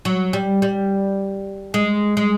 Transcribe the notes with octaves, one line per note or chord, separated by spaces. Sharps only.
F#3
G3
G3
G#3
G#3